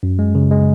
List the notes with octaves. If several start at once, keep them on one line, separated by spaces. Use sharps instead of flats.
F#2
G#3
C#3
G#3